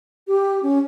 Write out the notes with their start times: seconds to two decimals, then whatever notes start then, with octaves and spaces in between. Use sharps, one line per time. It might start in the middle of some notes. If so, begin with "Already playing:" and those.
0.27 G4
0.63 C#4